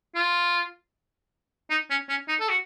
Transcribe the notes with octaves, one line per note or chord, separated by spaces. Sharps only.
F4
D#4
C#4
C#4
D#4
A4
F#4